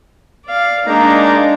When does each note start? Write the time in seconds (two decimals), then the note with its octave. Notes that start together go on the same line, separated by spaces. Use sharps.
0.46 D5 F5
0.86 G#3 A#3 D4 D#4 A#5